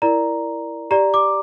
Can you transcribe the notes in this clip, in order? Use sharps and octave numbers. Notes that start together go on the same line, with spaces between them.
E4 A#4 D5 A#5
G4 D5 A#5
D6